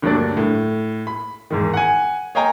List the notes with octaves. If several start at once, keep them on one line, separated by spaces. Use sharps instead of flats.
D2 G2 F#3 A#3 D4 D5
A2
B5
E2 G#2 D#3
F#5 G#5
C#5 D#5 F5 G5 G#5 A#5